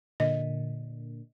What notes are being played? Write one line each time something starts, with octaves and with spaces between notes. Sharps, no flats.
A#2 D3 D#5